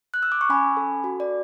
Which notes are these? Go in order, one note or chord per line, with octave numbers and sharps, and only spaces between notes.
F#6
E6
D6
C#6
C#4 G#5 B5
A4
F#4
D5